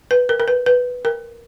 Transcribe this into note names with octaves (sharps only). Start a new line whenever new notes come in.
B4
A#4
A#4
B4
B4
A#4